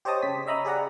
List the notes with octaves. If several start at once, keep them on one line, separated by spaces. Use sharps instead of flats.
G4 C5 C#5 D#5 A5 D#6
C#3 B6
C#5 D#5 E5 A#5 B5 D#6
G4 G#4 D5 F#5 A#5